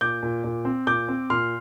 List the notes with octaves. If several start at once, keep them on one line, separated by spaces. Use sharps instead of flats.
A#2 D6 G6
A#2
A#2
C4
A#2 D6 G6
C4
A#2 C6 F6